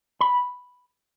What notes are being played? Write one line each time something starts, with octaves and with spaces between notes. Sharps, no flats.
B5